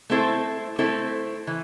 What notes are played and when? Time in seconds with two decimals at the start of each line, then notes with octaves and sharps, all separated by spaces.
0.10 A3 C4 E4 A4 C5
0.79 A3 C4 E4 A4 C5
1.47 E3